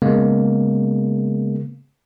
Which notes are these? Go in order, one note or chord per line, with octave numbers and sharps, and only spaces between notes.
C#3 G#3 A#3 B3